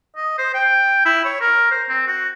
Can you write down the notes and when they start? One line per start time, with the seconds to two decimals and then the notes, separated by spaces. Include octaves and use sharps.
0.16 D#5
0.38 C5
0.54 G5
1.05 E4
1.25 C#5
1.41 A#4
1.71 C5
1.89 C4
2.07 F#4